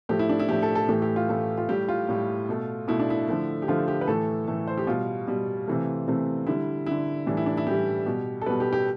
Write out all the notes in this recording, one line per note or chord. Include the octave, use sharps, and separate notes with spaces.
A2 F3 A3 G4
E4
D4
E4
A2 F3 A3 G4
A4
A4
A2 E3 A3 G4
G4
F4
A2 E3 A3
F4
A2 G3 G4
F4
A2 G3
B2 A3
B2 A3 E4
D4
E4
D3 F3 A3
G4
D3 F3 A3 F4
G4
B4
A2 E3 A3 A4
A2 E3 A3
C5
G4
B2 G3 F4
B2 G3
C3 E3 A3
C3 E3 A3
D3 G3 E4
D3 G3 E4
A2 E3 G3 D4
E4
D4
E4
A2 E3 G3 G4
B2 G3
A4
B2 G3 B4
G4
G4